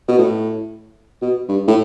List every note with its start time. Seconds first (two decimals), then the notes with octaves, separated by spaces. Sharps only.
0.08 B2
0.18 A2
1.22 B2
1.49 G2
1.68 A2